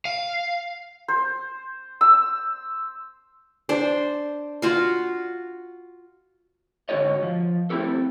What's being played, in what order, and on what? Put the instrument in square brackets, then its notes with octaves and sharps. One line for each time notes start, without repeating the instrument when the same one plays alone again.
[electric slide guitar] F5
[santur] C5
E6
[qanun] D4 C5
F4 F#4 F5
[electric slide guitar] G#2 D3 D#4 F#4 C#5 D#5
F3
A3 C4 E4 G4 A4